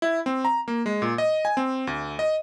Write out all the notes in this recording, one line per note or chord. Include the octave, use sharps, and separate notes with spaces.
E4
C4
A#5
A#3
G#3
A#2
D#5
G#5
C4
D2
D#5